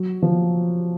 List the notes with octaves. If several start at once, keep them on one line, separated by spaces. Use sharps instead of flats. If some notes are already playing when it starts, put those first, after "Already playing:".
Already playing: F#3
F3